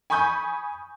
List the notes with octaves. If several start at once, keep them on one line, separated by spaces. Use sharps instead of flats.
G#5 B5 C#6 D#6 G6